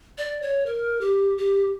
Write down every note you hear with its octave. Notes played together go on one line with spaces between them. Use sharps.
D5
C#5
A#4
G4
G4